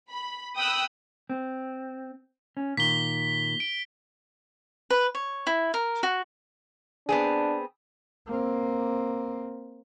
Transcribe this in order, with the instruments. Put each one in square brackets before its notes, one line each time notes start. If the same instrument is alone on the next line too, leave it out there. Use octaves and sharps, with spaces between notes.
[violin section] B5
G5 B5 D#6 E6 F#6
[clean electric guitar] C4
C#4
[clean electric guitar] A#2 D#3 [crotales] B6 G7
[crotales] D7
[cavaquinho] B4
C#5
E4
A#4
F#4
[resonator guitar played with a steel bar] B3 C4 G#4 [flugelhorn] D4
[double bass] A#3 C4